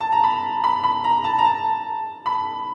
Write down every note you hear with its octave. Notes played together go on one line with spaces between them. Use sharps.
A5
A#5
B5
B5
B5
A#5
A5
A#5
A5
B5